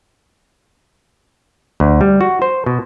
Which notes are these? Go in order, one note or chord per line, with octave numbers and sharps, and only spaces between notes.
D2
G3
F#4
C5
B2